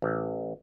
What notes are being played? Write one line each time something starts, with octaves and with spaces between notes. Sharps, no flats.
A1